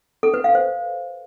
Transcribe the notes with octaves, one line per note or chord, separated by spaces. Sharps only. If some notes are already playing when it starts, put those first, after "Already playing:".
A4
B4
F5
C5